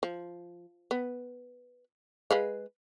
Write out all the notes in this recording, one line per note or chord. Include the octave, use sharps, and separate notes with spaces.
F3
B3
G#3 B4 F5